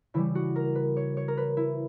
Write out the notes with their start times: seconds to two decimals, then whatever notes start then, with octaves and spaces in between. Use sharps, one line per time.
0.14 C#3 E3 G3 E4
0.35 F#4
0.56 A#4
0.75 B4
0.97 C#5
1.17 C#5
1.28 A#4
1.37 B4
1.57 E4